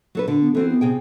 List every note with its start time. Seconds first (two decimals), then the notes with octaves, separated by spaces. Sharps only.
0.15 F#3 A4 B4
0.28 D3
0.41 B3
0.54 E3 C4 F#4 A4
0.69 B3
0.81 C3 G#4 G5